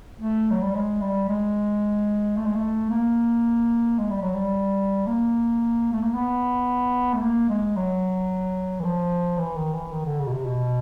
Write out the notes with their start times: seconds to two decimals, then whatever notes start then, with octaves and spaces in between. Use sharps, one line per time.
0.20 A3
0.51 F#3
0.62 G3
0.74 G#3
1.01 G3
1.28 G#3
2.37 A3
2.45 G#3
2.55 A3
2.90 A#3
3.98 G#3
4.10 G3
4.22 F#3
4.34 G3
5.07 A#3
5.92 A3
6.03 A#3
6.14 B3
7.14 A3
7.22 A#3
7.49 G#3
7.76 F#3
8.80 E3
8.84 F3
9.38 E3
9.56 D#3
9.73 E3
9.92 D#3
10.05 D3
10.19 C#3
10.27 B2
10.32 C3
10.46 B2